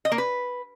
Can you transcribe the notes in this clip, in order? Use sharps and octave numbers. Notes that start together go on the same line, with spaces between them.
D#5
A#3
B4